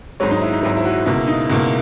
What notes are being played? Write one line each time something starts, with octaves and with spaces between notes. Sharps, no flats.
G#1 G#2 F#3 C#5
D#4
E4
D#4
G#1 G#2 F#3 E4
E4
F#4
C#2 B2 A#3 E4
D#4
C#2 B2 A#3 E4